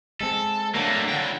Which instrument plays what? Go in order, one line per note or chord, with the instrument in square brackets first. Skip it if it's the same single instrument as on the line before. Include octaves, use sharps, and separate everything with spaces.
[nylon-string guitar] G#3 C4 [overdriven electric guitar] A4
[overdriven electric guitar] F#3 A3 [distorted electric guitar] A#3 D4 [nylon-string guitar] A4 C#5 F#5
[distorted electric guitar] F2 D3 [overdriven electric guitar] G5